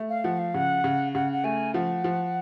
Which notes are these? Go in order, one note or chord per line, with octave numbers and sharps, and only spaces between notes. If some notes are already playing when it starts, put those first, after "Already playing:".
Already playing: A3
F5
F3 F#5
F5
C#3 F#5
C#3
C#3 F#5
F#5
A3 G#5
F3 F#5
F3